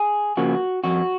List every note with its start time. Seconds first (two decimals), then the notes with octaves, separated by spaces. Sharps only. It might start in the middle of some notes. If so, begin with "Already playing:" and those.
Already playing: G#4
0.37 C#3 F3 A#3 F#4
0.84 F2 F#4